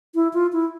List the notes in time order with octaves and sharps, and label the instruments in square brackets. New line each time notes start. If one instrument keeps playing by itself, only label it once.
[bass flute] E4
F4
E4